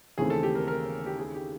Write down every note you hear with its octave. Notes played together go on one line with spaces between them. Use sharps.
D#2 C#3 E3 A3 C4 G#4
A4
G4
A#4
A#4
G4
G#4
G4